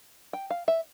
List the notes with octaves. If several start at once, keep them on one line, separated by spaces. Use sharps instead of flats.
G5
F5
E5